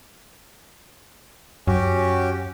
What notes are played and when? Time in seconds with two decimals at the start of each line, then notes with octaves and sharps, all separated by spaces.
1.67 F#2 C#4 F#4 G4